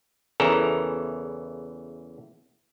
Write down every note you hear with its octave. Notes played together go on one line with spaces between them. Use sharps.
E2 C#3 E3 A4 A#4 A#5